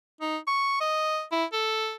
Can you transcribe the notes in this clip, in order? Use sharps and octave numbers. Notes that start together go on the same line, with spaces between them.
D#4
C#6
D#5
E4
A4